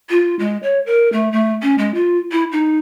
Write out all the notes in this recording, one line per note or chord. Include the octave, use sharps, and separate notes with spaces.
F4
G#3
C#5
A#4
A3
A3
C#4
G#3
F4
E4
D#4